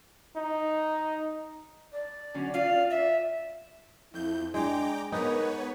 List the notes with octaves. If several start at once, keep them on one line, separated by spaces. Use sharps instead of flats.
D#4
D5
D3 F#3 C#4
F4 F5
E5
F2 E4 G6
G#3 D4 G5 A#5 D6
B3 D#4 A#4 B4 C#5